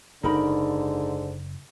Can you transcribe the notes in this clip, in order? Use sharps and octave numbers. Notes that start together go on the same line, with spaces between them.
F#1 G#2 D3 D#4 A#4 B5